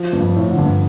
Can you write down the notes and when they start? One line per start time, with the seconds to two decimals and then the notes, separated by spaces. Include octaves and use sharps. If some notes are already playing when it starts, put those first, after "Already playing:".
Already playing: F3
0.13 G2
0.21 F2
0.36 A2
0.51 D3
0.59 G2